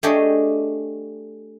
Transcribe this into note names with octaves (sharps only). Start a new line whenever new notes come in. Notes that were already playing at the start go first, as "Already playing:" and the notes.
A3 D4 G4 G#4 C#5 D#5